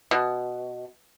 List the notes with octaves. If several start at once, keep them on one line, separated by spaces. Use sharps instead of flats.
B2